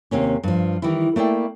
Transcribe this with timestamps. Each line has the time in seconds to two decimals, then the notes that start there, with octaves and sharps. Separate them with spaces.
0.11 D#2 C3 A#3 C#4
0.43 G2 F3
0.82 D#3 E3 G3 E4
1.16 A3 A#3 E4 D5 G5